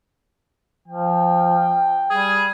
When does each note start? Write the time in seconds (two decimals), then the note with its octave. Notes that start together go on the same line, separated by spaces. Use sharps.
0.88 F3 G5
2.11 G3 G#4